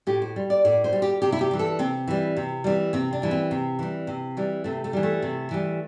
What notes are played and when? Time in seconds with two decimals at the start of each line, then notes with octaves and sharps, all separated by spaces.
0.07 A2 G4
0.22 C5
0.36 G3
0.50 D5
0.65 A2 D5
0.84 C5
0.93 G3
1.02 G4
1.22 C3 G4
1.32 E4
1.41 G4
1.51 E3 G3
1.59 A4
1.79 C3 C4
2.08 E3 G3
2.37 C3
2.64 E3 G3
2.93 C3 C4
3.13 D4
3.22 E3 G3
3.31 C4
3.51 C3
3.79 E3 G3
4.07 C3
4.37 E3 G3
4.64 C3 A3
4.84 A3
4.93 E3 G3
5.03 A3
5.22 C3
5.51 E3 G3